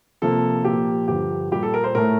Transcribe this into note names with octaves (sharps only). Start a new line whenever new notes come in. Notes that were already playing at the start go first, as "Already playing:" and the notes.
C3 F3 A#3 A4
A#2 F3 A#3 G4
G2 D3 F3 G4
A#2 G3 A#3 G4
A4
A#4
C5
A2 A3 A#4